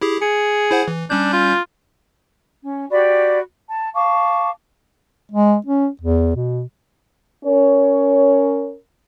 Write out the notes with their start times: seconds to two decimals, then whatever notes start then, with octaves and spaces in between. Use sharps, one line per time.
0.01 E4 G4 G#4
0.22 G#4 C#7
0.71 E4 C5 F#5
0.88 E3
1.10 G3 C#4 D4 G6
1.33 F4
2.63 C#4
2.90 F#4 G4 D5 B5
3.69 A5
3.94 F5 A5 C#6 D6
5.32 G#3
5.66 C#4
6.01 E2
6.35 B2
7.44 C#4 A#4 C#5